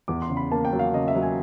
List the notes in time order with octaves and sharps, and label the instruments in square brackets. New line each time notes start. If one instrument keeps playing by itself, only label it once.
[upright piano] E2 D6
C6
C#3
B5
A#3 A5
G5
F#3
F5
C#3 D#5
E5
F#3
G#5